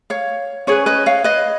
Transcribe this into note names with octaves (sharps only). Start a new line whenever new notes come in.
C#5 F5
C#4 G#4 B4 C#5
B4 D#5
C#5 F5
B4 D#5